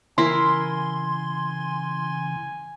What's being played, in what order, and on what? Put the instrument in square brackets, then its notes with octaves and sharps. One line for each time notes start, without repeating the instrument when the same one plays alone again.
[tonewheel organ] C#3 E3 [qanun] E4 A#4 [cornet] G#5 [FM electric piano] C6